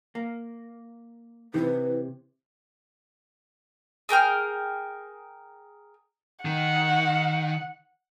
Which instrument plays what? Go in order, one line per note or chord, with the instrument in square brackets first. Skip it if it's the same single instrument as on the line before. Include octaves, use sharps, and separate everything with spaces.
[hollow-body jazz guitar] A#3
[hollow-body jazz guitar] C3 [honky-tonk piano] E3 [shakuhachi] B4
[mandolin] G#4 A#4 G5 F6
[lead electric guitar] D#3 [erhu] F#5